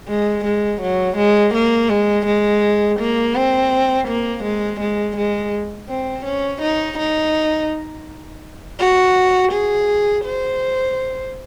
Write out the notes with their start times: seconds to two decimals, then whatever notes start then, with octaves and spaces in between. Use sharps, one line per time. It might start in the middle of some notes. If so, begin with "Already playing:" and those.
0.08 G#3
0.45 G#3
0.81 F#3
1.17 G#3
1.54 A#3
1.89 G#3
2.26 G#3
3.00 A#3
3.35 C4
4.08 A#3
4.44 G#3
4.80 G#3
5.17 G#3
5.89 C4
6.25 C#4
6.62 D#4
6.99 D#4
8.79 F#4
9.52 G#4
10.25 C5